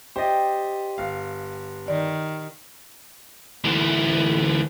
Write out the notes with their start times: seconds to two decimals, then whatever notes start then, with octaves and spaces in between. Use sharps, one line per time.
0.16 G4 C5 D5 D#5
0.98 G1 F5
1.88 D#3 D5
3.64 D2 E3